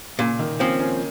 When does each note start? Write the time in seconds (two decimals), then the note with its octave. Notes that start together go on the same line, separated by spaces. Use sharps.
0.19 A#2 C#3
0.39 D#3
0.60 F3 A#3 C4 C#4
0.80 A#3 C#4